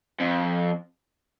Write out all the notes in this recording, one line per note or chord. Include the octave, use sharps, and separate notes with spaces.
F2